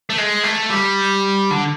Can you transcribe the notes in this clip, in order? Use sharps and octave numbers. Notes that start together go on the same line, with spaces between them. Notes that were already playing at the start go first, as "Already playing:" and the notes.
A3
G#3
A3
G3
D3